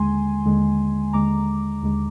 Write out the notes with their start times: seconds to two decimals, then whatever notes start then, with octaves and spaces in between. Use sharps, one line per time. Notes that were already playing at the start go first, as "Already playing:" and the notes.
Already playing: D#2 D3 G#3 G#5 C6
0.45 D#2 D3 G#3
1.13 D#2 D3 G#3 A#5 D6
1.82 D#2 D3 G#3